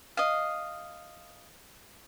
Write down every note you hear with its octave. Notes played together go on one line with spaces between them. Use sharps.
D#5 F5